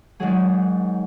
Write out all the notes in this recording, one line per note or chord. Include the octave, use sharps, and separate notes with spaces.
G#2 D#3 F#3 G#4